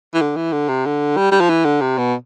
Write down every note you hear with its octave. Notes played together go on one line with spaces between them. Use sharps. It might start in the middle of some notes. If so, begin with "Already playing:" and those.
E3
D3
E3
D3
C3
D3
G3
G3
F3
E3
D3
C3
B2